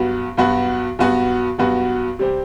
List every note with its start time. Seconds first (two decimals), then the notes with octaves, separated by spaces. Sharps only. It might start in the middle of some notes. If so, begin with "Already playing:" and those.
Already playing: G2 F#3 B3 F#4
0.37 G2 F#3 B3 F#4
0.99 G2 F#3 B3 F#4
1.58 G2 F#3 B3 F#4
2.19 C3 G3 C4 G4